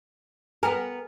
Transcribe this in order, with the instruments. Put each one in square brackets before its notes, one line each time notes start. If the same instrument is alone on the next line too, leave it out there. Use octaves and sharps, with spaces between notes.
[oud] B3 A#4 [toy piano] G5 G#5